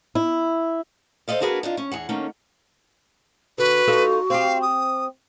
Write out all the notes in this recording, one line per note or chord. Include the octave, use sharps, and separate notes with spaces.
E4
A4 C5 D5 D#5 F5
A#3 D4 F#4 G#4 A#4 B4
D4 D#4 F4
C#4
E2 G#4 F#5
D#3 A3 A#3 C#4
D3 F#4 B4
D#4 F4 A4
C4 G4 F5
D#6